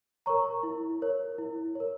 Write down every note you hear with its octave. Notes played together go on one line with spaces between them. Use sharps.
A#4 C#5 A#5 C#6
E4
A#4 C#5
E4
A#4 C#5